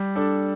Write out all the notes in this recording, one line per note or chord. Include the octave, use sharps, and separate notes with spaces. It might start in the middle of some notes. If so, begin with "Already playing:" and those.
Already playing: G3
D4 A4